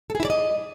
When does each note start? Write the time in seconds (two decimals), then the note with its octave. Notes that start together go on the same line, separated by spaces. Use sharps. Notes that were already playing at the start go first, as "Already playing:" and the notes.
0.10 A4
0.15 G#4
0.20 E4
0.25 D5
0.30 D#5